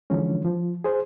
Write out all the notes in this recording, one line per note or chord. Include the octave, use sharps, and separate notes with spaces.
D3 E3 F3 G#3 C#4
F3
G#4 C5